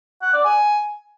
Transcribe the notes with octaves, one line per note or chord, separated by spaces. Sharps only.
F#5
D5
G#5